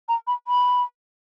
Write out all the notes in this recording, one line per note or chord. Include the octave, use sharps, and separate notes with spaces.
A#5
B5
B5